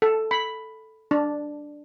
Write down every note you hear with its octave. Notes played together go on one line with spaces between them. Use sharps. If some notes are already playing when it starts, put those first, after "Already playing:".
A4
B5
D4